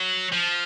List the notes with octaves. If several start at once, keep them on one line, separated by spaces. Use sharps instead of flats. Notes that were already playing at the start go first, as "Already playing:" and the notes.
Already playing: F#3
F3